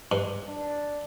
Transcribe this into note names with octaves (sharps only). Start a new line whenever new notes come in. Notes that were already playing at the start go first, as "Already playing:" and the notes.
G2
D4